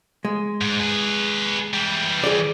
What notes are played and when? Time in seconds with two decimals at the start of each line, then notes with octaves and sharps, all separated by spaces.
0.25 G#3
0.61 G#2
0.80 G#4 B4
1.73 E3 G3
2.24 G#4 D5